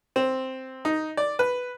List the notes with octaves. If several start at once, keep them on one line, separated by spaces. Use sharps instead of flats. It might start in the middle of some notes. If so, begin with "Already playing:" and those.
C4
D#4
D5
B4